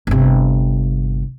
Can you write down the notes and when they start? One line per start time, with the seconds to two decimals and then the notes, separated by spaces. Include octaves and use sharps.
0.07 G1 C3